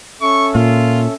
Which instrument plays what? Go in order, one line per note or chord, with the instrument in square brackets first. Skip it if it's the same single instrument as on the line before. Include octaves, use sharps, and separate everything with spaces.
[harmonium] C#4 A4 E5 [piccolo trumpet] C#6
[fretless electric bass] A#2 [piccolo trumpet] F4